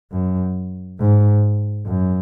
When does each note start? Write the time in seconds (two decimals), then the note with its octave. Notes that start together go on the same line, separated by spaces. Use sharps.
0.12 F#2
0.99 G#2
1.86 F#2